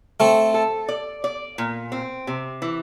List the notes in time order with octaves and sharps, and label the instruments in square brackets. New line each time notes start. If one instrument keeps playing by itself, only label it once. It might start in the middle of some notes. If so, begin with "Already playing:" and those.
[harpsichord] A3 C4 [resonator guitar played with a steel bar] A4
[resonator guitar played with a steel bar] A4
D5
D5
A#2
C4
C3
E3